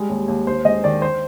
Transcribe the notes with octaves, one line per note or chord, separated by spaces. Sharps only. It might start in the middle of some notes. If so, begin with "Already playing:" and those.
Already playing: G3 G#3
D#2
D#2
D#2 C5
G#3 D#5
D#3 D5
C5